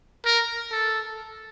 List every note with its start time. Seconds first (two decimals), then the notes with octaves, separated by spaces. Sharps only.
0.25 A#4
0.72 A4